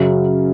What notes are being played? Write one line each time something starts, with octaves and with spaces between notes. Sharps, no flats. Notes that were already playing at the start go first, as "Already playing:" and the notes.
Already playing: F#2 C#3 F#3